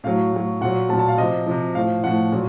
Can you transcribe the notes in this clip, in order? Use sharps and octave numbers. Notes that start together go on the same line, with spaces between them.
A2 F#3 F5
A2 F#3
A#2 F#3 F#5
A#2 F#3 A5
A5
F5
C3 F3 D#5
C3 F3
A2 F3 F5
A2 F3 F#5
A#2 F#3